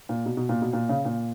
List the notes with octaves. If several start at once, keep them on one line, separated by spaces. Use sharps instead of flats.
A#2
B2
B2
A#2
B2
A#2
C#3
A#2